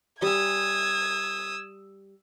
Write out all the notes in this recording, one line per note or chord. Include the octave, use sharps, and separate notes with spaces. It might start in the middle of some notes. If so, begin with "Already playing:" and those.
G3 G#5 D#6 E6 G#6